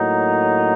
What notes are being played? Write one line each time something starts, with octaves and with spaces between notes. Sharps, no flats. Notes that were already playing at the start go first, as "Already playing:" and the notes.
Already playing: A2 F#3 A#3 D#4